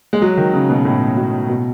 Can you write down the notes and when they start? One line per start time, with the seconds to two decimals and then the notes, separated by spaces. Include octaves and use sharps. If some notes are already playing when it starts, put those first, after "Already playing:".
0.13 G#3
0.22 F#3
0.37 D#3
0.54 C#3
0.70 B2
0.85 A2
1.17 B2
1.49 B2